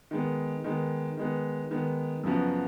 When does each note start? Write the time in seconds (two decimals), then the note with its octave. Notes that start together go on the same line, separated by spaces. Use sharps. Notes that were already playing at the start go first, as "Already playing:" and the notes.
0.11 D#3 G#3 B3
0.64 D#3 G#3 B3
1.17 D#3 G#3 B3
1.71 D#3 G#3 B3
2.24 F#2 C#3 F3 B3 F#4